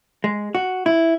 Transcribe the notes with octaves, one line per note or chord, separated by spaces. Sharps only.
G#3
F#4
E4